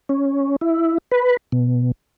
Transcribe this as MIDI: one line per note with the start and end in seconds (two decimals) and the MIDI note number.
0.09 0.56 61
0.61 0.98 64
1.12 1.37 71
1.52 1.92 47